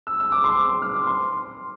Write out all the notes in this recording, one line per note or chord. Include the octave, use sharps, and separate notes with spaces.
E6
E6
D6
C6
D6
F6
D6
C6